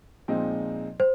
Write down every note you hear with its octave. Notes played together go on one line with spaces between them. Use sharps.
A#2 F3 G#3 C4 D#4
C5